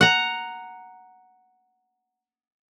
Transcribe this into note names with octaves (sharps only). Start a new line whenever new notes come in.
F#5 A#5